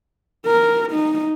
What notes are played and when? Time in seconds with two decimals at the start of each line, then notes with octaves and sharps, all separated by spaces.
0.46 A#4
0.92 D#4